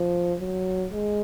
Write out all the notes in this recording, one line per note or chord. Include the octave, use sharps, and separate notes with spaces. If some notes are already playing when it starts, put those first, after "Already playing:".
Already playing: F3
F#3
G#3